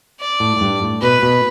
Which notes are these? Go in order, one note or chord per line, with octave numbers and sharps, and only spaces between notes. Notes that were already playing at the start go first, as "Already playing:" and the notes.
D5
A2
A2
G2
A2
B2 B4
B2